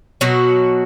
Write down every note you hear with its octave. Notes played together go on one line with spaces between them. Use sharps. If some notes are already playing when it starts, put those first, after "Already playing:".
B2 F#3 F#4